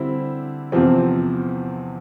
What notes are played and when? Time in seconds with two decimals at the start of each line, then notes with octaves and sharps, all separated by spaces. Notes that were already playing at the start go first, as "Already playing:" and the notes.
Already playing: D3 G3 C4 E4
0.72 E2 C3 F3 C4